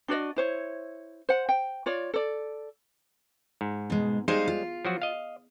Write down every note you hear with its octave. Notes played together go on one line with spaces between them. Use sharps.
D4 F#4 D5 D#5
E4 C5 C#5
C5 F#5
G5
F4 C#5 D5
A4 D5
G#2
B2 G#3
G3 G#3 D#4 G#4 C5 F5
F4
F3 F#3 F#4
D#5 F5